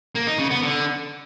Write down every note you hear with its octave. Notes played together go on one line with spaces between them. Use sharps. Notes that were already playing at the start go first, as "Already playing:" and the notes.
A#3
D#4
C#3
B3
D3